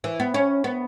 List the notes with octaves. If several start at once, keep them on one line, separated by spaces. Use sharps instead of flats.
E3
B3
C#4
B3